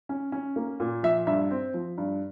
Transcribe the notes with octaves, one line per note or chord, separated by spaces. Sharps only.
C#4
C#4
A#3
A#2
F3 E5
G2 E5
C4
F3
G2